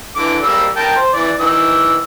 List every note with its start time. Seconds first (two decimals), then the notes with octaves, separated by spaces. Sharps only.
0.16 D3 E3 D6
0.43 G3 A#3 E6
0.77 A#4 G5 A5
0.96 C5
1.13 E3 D5
1.40 D#3 E3 E6